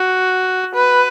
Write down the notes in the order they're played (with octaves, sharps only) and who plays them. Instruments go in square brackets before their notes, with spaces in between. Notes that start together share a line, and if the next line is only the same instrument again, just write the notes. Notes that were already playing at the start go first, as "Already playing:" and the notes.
Already playing: [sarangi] F#4
B4